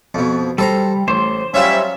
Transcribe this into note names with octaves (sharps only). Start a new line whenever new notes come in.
F2 B2
G3 A4 C5 A#5
A1 C5
F#3 G3 C#4 F4 E5